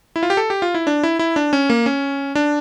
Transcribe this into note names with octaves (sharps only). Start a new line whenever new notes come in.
E4
F4
G4
A4
G4
F4
E4
D4
E4
E4
D4
C#4
A#3
C#4
D4